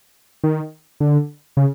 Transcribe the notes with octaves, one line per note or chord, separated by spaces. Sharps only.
D#3
D3
C#3